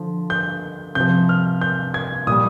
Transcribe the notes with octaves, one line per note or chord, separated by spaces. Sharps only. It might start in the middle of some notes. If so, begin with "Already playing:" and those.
Already playing: D3 F3
G6
C3 F3 G6
F6
G6
G#6
A#2 G3 D#6